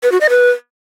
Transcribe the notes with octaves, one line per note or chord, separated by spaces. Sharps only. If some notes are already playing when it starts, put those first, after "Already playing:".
B4
F#4
D#5
B4